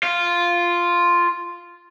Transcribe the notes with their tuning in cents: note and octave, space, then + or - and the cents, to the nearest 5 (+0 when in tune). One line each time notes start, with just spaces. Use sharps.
F4 -5